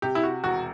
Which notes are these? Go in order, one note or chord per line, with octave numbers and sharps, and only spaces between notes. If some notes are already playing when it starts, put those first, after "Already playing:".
C3 G4
E4
F#4
E1 F#4